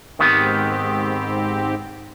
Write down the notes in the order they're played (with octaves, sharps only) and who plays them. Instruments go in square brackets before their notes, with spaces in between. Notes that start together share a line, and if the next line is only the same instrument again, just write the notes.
[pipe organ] G#2 C4 G4 [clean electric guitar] D#3 B3